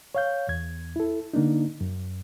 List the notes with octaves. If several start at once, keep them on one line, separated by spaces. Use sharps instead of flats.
C#5 F5 G6
E2 G#6
E4 A4
D3 A#3 D4 D#4
F#2